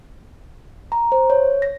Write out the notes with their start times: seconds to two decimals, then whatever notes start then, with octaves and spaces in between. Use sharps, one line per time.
0.92 A#5
1.12 C5
1.30 C#5
1.62 A#6